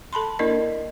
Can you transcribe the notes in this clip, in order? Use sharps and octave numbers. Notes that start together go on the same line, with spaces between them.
A4 A5 B5 C6
A#3 D4 E4 A#4 D5 D#5